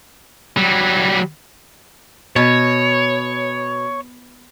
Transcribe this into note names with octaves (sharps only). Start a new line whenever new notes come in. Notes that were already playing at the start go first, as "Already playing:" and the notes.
F#3 G3
B2 C#5